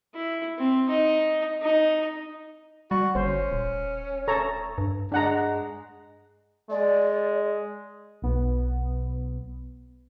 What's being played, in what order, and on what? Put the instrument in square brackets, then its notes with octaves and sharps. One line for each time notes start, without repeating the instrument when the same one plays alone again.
[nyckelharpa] E4
C4
D#4
D#4
[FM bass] G3 [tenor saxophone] F#4
[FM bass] G1 [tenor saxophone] C#4 [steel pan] C5
[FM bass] D#1
[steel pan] A4 C#5 A#5
[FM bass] G2
[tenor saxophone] G#3 [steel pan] D4 F#5 A#5
[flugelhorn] G#3 [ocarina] D5
[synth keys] B1 B3